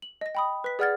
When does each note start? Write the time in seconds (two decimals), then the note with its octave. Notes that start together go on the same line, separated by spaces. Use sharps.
0.02 F#7
0.21 D#5 A#6
0.35 G5 B5 D#6
0.64 B4 B6
0.79 G#4 D5 F#5 F6 G#6 A6